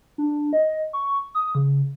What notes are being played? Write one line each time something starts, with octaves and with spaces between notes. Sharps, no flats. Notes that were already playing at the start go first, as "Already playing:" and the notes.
D4
D#5
C#6
D#6
C#3